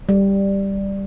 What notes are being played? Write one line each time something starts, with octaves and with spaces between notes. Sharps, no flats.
G3